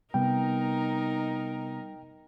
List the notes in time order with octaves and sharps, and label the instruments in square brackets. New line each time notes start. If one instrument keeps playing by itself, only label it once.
[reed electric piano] C3 B3 [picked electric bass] G3 [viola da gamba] D#4 A#4 [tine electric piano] G5